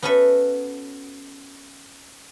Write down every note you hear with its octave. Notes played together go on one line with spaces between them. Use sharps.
B3 C#4 F#4 A4 B4 E5